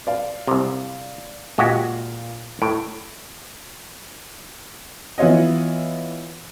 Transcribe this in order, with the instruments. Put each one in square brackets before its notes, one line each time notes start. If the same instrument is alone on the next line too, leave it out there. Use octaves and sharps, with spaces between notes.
[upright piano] D5 F5
[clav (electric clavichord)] C2 C3
[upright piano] A#2 F5 [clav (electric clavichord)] G#3 F#4 G4
[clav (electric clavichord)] A2 [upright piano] D7
[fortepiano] E3 B3 F4 C#5 D#5